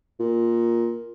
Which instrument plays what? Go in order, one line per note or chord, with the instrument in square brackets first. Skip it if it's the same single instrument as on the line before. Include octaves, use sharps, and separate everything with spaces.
[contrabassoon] A#2